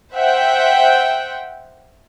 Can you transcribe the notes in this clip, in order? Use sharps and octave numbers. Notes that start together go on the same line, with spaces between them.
C5 E5 F#5 G5